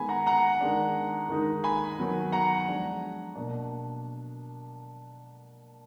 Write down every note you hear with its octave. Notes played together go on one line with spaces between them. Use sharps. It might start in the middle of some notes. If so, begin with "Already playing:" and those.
Already playing: D#3 G#3 B3 G#5 B5
F#5 A#5
F#5 A#5
D#3 G#3 D4
D#3 G#3 D#4
G#5 B5
D#3 F#3 B3
F#5 A#5
F3 G#3 D4
B2 A#3 D4